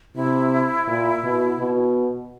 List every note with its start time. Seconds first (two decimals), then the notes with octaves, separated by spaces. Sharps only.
0.16 C3 E4
0.87 A#2
1.24 B2
1.59 B2